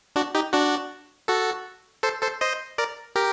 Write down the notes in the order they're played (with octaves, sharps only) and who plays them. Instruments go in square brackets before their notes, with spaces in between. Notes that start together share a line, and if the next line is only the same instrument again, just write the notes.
[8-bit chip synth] D4 F#4
D#4 G4
D4 F#4
F#4 A4
A4 C5
A4 C5
C5 D#5
A#4 D5
G4 A#4